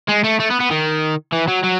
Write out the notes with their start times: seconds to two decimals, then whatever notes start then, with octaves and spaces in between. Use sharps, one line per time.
0.09 G#3
0.24 A3
0.40 A3
0.50 B3
0.60 B3
0.71 D#3
1.33 E3
1.48 F#3
1.64 F#3